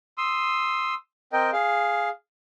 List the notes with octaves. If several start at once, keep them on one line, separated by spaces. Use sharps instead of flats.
C6 D#6 E6
C4 A#4 D#5 G5
G#4 F5